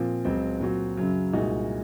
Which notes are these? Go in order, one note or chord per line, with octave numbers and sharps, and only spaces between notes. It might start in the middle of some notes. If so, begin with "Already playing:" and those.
Already playing: A#2 F3 C4
C#2 C#3 F#3 C4
A#2 F#3 C4 F#4
F#2 C#3 F#3
C2 A#2 G#3 D#4 F#4